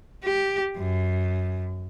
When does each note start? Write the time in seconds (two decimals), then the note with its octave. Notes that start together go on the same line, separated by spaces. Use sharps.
0.24 G4
0.77 F#2